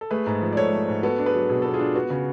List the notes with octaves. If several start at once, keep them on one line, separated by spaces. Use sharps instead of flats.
A4
A3 G#4 B4
G#2
F3
D5
G#2 A4 C#5
A3
G#2
B3 F#4 A4
D4
G#4 B4
F#3
B2 G#4
B3 A4
F4 G#4
D4
B3 F#4
C#3